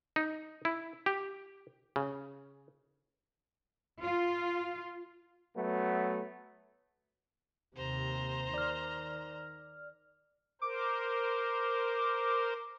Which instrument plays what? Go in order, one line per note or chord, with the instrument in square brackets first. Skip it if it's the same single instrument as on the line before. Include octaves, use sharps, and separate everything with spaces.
[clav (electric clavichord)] D#4
E4
G4
C#3
[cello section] F4
[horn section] F#3 A3 B3
[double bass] D#2 C3 [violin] C5 A#5
[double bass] D#3 [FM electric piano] D5 F6
[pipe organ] A#4 C5 [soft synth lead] D6